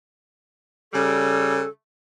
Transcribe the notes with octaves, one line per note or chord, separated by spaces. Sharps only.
C#3 G3 A4